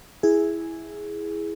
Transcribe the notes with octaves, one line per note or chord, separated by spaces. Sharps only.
E4 G#4